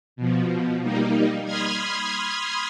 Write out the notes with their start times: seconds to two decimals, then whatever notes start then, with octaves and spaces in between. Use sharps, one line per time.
0.16 B2 F3
0.83 G3 A#3 D#4
1.45 B5 C6 D#6 F6 G#6